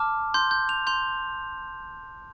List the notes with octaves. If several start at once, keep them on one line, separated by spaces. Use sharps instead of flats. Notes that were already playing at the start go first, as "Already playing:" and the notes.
Already playing: A5 D6 F6
C6 G6
G6
F7
C6 G6 F7